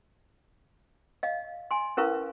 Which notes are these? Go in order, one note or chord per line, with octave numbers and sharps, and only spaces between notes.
D#5 F5
G#5 C6
C#4 E4 A#4 B4 F5 C#6